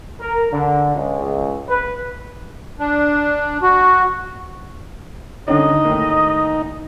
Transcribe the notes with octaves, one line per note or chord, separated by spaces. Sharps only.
A#4
D3
C#2
B4
D4
F#4
D3 D#3 C#4 D#4 D#5
D#2 A2 A#3